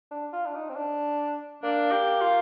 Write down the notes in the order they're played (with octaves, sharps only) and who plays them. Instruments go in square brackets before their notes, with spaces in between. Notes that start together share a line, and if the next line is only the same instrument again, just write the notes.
[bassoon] D4
F4
D4
D#4
C4
D4
[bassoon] A#3 [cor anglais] D4
[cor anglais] G4
F4